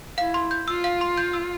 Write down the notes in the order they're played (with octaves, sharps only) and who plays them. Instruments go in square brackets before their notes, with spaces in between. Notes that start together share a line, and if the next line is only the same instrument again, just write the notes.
[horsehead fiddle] E4 [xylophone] F5
[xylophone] C6
G6
[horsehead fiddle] F4 [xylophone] E6
[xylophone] F5
C6
G6
E6